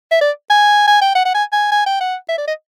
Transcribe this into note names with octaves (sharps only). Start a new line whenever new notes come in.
E5
D5
G#5
G#5
G5
F#5
F#5
G#5
G#5
G#5
G5
F#5
E5
D5
D#5